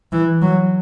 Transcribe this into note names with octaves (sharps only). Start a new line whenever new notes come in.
E3
F#3